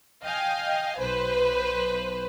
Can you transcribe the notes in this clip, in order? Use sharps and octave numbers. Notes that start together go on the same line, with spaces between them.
D#5 F5 G5 G#5
B1 B4 C5